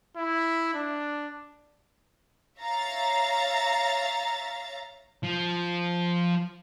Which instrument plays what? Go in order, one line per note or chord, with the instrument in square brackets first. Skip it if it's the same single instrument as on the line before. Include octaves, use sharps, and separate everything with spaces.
[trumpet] E4
D4
[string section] C#5 E5 F5 A#5 A6
[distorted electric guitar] F3